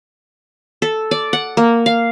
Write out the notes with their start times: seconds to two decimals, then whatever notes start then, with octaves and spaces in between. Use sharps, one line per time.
0.82 A4
1.11 D5
1.33 F#5
1.57 A#3
1.86 F5